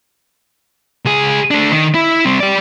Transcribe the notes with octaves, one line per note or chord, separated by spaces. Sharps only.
C#2 G#4
A3 D4
D#3
E4
G3 C4
G4 D5